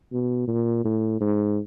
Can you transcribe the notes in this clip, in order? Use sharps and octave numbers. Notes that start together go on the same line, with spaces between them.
B2
A#2
A2
G#2